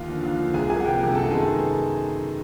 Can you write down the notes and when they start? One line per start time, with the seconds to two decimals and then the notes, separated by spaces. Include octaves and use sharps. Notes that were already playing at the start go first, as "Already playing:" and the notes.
Already playing: D#2 F4 F5
0.09 D3 F3
0.23 D#2
0.39 D3 F3
0.54 C2 G#4 G#5
0.69 C3 F3 A#3 G#4 G#5
0.80 F#5
0.85 C2 G4 G5
1.00 C3 F3 A#3
1.15 F#2 A4 A5
1.30 D#3 G#3 B3 G#4 G#5